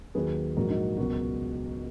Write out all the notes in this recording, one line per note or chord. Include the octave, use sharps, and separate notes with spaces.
D#2 D#3 F#3 G#4 B4
A#1 G#2 F#3 F#4 A#4
D#4 F#4
C#2 B2 F#3 F#4 A#4